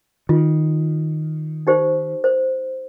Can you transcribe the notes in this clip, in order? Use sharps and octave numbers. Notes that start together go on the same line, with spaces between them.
D#3 F4
D#4 G4 C5
C5